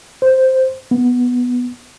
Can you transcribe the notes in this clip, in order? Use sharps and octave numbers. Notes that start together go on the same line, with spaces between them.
C5
B3